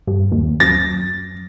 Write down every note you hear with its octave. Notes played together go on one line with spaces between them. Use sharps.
G2
D#2
F#2 A6 A#6